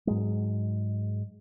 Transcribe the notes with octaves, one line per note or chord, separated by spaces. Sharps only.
G#2 F#3 G#3